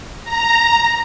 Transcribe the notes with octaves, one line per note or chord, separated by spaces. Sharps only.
A#5